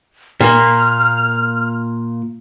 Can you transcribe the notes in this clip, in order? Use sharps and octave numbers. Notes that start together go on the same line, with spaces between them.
A#2 A#3 F6